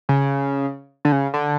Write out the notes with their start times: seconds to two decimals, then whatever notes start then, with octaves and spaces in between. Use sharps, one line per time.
0.09 C#3
1.05 D3
1.12 C#3
1.34 D3